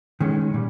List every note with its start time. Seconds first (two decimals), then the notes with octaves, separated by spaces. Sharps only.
0.21 D#3 G#3 C#4
0.54 A#2 G3